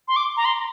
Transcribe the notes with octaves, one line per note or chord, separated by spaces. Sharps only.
C6
D6
A#5
C6